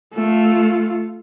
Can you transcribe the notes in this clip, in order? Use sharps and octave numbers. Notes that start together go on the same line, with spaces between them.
A3 F4